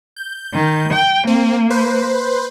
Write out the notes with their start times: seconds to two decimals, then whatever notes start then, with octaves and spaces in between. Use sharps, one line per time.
0.16 G6
0.53 D#3
0.93 G5
1.27 A#3 C4
1.70 B4 C5